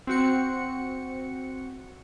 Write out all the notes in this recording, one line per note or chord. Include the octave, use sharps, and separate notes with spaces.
C4 F#4 C#7